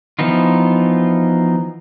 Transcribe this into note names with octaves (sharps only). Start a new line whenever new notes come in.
E3 F3 B3 D#4 F4